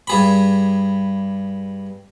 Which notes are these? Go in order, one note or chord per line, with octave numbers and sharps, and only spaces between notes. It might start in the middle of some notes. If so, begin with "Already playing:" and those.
G2 G#4 B5